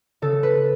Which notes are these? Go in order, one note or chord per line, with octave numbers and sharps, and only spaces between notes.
C#3 A4
B4